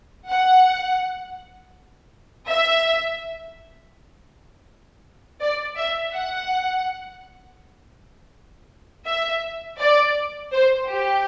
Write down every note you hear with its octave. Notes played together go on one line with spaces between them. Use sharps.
F#5
E5
D5
E5
F#5
E5
D5
C5
G4